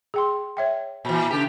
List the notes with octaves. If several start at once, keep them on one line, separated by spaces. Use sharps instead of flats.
G#4 G5 C6
C#5 E5 G5
A#2 E3
C#3 G4